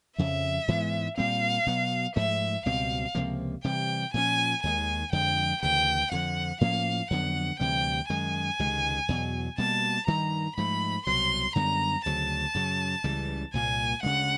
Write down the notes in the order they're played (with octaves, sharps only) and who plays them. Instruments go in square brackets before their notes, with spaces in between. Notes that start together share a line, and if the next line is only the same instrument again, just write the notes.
[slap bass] F2 C#3 F3 [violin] E5
[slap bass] G#2 E3 G#3 B3
[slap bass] A#2 G3 C4 [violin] F5
[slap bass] B2 F#3 B3
[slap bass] G#2 F3 A3 [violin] E5
[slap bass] C#2 B2 G3 C4 [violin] F5
[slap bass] C#2 C3 F3 A#3
[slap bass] C3 E3 G3 [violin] G5
[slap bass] A#2 F3 G#3 C#4 [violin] G#5
[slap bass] D#2 D#3 G#3 [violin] G#5
[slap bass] F2 D3 F3 G#3 [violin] G5
[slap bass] D2 C#3 E3 [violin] G5
[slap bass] F2 D3 F3 [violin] F#5
[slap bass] A2 F3 A#3 C#4 [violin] F5
[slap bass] F2 D3 F#3 B3 [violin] F#5
[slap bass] D2 C3 E3 G3 [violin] G5
[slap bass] F#2 D#3 G#3 [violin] G#5
[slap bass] C#2 C3 D#3 G#3
E2 B2 F#3
[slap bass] B2 G3 A#3 [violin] A5
[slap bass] G2 D#3 G3 [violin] A#5
[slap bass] G#2 F3 A3 [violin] B5
[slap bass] C2 B2 F#3 [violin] C6
[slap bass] F#2 D3 G3 B3 [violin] A#5
[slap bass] D2 C#3 F#3 [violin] A5
[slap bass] F#2 C#3 F#3
C#2 C#3 E3 G3
[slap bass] C2 A#2 F#3 A#3 [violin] G#5
[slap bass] D2 C#3 E3 G#3 [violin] F#5